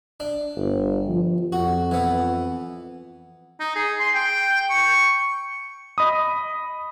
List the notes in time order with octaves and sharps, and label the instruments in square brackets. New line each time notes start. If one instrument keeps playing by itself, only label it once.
[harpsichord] D4
[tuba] G1
F3
[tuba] F2 [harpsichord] F#4
[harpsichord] E3 B3
[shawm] D#4
G#4
C6
G5
C#6
[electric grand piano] D#5 B5 D#6